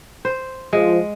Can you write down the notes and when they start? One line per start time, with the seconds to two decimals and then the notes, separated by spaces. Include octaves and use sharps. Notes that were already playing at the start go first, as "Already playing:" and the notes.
0.25 C5
0.73 F3 G#3